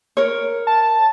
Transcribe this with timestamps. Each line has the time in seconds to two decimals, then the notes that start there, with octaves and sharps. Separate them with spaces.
0.17 A#4 C#5
0.67 A5